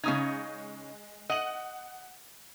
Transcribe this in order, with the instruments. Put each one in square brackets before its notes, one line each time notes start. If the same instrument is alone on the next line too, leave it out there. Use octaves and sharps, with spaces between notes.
[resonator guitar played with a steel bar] C#3 C#4 D#4 [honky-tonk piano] G#3 D#6 G#6
[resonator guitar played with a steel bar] D#5 [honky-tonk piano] F#5 F#7